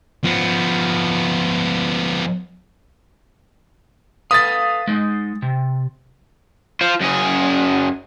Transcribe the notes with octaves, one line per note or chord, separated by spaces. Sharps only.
F3 B3
A4 B4 F5 D#6 A6
G#3 D#4
C3
F4 C5
F#2 G#4